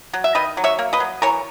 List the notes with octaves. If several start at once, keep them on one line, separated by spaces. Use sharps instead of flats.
F#3
E5
D#3 B4 D#5
F#3
C#5 E5
A#3
B4 D#5
F#3
E3 A#4 C#5